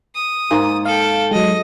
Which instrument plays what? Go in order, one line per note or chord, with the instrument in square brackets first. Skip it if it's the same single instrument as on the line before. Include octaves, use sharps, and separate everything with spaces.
[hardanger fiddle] D#6
[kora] G#2 A#3 D5
[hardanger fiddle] A4 G5 [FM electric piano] F5
[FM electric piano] F#3 G#3 [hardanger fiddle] D#5